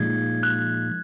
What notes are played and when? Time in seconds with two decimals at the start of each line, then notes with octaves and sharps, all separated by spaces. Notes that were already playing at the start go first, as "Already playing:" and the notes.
Already playing: A#2 F3 G#3 D#4 G#6
0.43 F#6